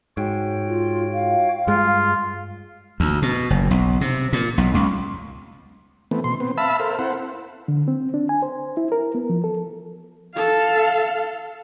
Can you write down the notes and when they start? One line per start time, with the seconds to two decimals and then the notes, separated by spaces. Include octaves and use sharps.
0.17 G#2 F#4 C#5 G5
0.67 F4
1.13 F5
1.67 G2 G#3 F4
3.00 D2
3.22 B2
3.50 F#1
3.71 B1
4.01 C3
4.33 A#2
4.58 B1
4.74 C#2
6.11 E3 A3 B3 C4
6.24 B2 C6
6.40 B3 C4
6.58 E5 F5 A5 B5 E6
6.80 A4 A#4 C5 F5
6.99 C4 E4 C5 F#5
7.68 D3
7.88 C4
8.14 D4
8.29 G#5
8.42 C5
8.77 E4
8.92 A#4
9.15 B3
9.29 F3
9.44 A4
10.35 A4 F5